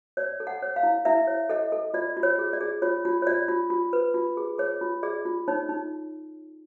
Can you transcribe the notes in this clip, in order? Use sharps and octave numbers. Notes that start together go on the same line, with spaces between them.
C#5 D5
A4
F#5
C#5
F5
E4
E4 E5
C#5
A4 D#5
A4
F4 D5
F4
C#5
G#4
D5
G#4
F4 C#5
F4
C#5
F4 D5
F4
F4
B4
F4
G#4
G#4 C#5
F4
G#4 D5
F4
D#4 C#5
D#4